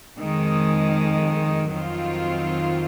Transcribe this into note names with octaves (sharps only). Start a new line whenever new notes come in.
F2 D#3 G#3
F2 D#3 F#3 C4 F4